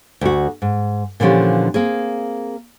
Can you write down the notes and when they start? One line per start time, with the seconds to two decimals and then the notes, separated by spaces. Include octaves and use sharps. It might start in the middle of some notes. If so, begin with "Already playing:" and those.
0.21 D2 F#4
0.62 G#2
1.20 A#2 D3 E3 F3 C#4 G4
1.74 A#3 C4 G#4